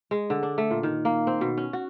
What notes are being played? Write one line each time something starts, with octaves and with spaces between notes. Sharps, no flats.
G#3
D3
D4
A3
A#2
D#3
A#3
C4
B2
C#4
F#4